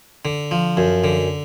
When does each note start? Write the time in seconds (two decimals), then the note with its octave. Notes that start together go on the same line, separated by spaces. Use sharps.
0.25 D3
0.51 F3
0.77 F#2
1.04 D3